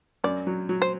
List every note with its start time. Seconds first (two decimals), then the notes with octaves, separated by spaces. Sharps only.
0.24 F#2 D5
0.47 F#3
0.69 F#3
0.82 C5